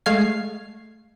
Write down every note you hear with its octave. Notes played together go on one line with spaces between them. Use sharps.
G#3 A3 F5 G#6 C7